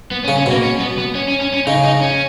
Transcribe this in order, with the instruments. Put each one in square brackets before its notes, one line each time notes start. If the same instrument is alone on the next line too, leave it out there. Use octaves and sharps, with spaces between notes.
[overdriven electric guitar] B3
C#4
[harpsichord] C#3
[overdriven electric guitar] C#4
[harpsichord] B2 [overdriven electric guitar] A#3
[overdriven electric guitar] C#4
B3
B3
C#4
C#4
C#4
C#4
[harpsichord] C#3 [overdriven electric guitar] D#4
[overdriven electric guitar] D#4
C#4